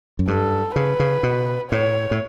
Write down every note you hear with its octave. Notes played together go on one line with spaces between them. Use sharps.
F#2
G2 A4
C#3 B4
C#3
B2
A2 C#5
A2